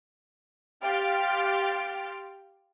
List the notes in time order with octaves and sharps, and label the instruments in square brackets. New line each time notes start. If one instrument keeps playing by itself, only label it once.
[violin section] G4 F5 C6 F6 A6 D7